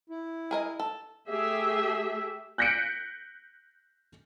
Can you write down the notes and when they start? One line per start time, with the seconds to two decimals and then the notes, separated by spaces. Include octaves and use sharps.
0.10 E4
0.51 G#4 A#4 D#5
0.79 A4
1.30 A3 G4 G#4 E5
2.58 F#6 G6 A#6 B6 C#7 D7